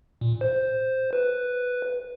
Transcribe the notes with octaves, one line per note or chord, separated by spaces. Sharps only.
A#2
C5
B4